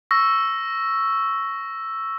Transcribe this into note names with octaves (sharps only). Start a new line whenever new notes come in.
C#6 E6 A#6